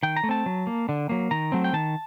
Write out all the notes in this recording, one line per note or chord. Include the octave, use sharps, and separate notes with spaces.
D#3 G5
A#5
A3
C4 A5
F#3
A#3
D3
F#3 A#3
D#3 A#5
F#3 A3 C4
G5
D#3 A5